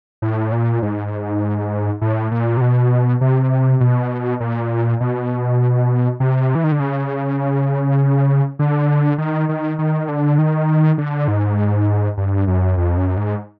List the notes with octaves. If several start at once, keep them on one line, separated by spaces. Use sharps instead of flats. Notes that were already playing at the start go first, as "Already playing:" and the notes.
A2
A#2
G#2
A2
A#2
C3
B2
C3
B2
A#2
B2
C3
E3
D#3
D3
C#3
D3
D#3
D#3
D#3
D3
D#3
D3
G#2
G2
F#2
F2
F#2
G#2